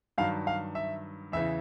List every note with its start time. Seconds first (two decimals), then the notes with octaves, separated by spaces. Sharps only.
0.18 G2 D#3 F#3 F5
0.47 F5
0.75 E5
1.32 E2 C#3 E3 E5